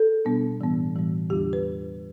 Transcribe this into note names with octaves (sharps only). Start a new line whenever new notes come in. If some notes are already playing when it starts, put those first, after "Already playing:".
Already playing: A4
B2 G3 B3 D4
A2 E3 G3 B3
A2 E3 G3 B3
E2 D3 G3 D4 F4 G4
B4